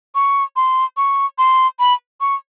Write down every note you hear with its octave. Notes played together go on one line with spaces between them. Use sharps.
C#6
C6
C#6
C6
B5
C#6